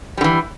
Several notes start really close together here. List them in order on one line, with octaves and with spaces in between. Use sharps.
G3 D3 E3